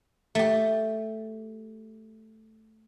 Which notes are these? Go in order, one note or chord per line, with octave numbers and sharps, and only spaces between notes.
A3 G4